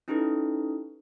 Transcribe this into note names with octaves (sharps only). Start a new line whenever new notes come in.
C#4 D#4 E4 G4 A4 B4